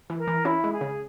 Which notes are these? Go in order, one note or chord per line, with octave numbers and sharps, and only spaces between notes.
E3
A#4
E3
C#4 E4
G#3
G#4
C#3